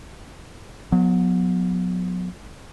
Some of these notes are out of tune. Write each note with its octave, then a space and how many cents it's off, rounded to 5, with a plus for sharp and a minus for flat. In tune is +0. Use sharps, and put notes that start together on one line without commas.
F#3 -35 B3 +0